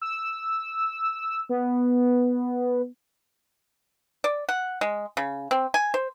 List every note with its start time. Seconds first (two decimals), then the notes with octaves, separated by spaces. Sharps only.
0.02 E6
1.49 B3
4.24 D5
4.49 F#5
4.81 G#3
5.17 C#3
5.51 C4
5.74 G#5
5.94 C5